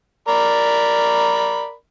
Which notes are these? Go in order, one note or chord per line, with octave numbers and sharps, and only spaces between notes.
A#4 D5 B5